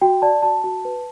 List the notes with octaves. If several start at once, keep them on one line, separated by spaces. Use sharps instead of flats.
F#4 G5
D5 A5
F#4 A5
F#4 A5
B4